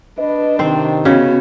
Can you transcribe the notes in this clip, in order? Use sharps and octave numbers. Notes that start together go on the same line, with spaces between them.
D4 B4 D#5
C3 D#3 C4 C5
C#3 B3 C#4 F#4